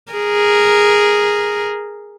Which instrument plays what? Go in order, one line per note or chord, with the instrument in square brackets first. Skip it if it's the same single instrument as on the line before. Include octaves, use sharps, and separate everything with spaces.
[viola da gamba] G#4 A#4